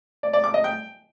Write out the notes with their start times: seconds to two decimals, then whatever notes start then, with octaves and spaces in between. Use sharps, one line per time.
0.23 D5
0.33 D5
0.44 D6
0.54 D#5
0.64 G5